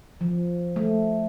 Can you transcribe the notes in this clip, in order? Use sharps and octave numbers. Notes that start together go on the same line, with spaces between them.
F3
A3